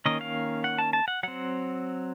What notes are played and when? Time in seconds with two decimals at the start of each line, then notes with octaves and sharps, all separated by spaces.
0.06 D#3 A#3 C#4 D#5
0.21 F5
0.64 F#5
0.78 A5
0.93 A5
1.08 F#5
1.23 F#3 C4 F#5